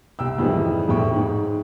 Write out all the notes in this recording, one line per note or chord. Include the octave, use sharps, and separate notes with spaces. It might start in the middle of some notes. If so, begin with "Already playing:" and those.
C2 G5 E6
F2 G#2 D#3 E3 G3
E1 F2 A2 G5 C#6
G#2